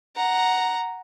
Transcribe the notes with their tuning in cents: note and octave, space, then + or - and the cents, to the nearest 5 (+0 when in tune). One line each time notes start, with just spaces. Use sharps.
F#5 +0 A#5 +0